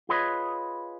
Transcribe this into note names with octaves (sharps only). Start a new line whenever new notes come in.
F4 G#4 B4 C#5 D#5